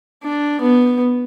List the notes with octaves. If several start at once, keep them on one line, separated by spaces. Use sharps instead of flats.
D4
B3